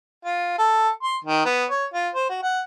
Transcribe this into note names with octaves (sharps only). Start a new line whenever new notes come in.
F4
A4
C6
D#3
B3
C#5
F4
C5
F#4
F#5